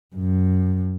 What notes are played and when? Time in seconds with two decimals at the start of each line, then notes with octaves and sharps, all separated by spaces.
0.16 F#2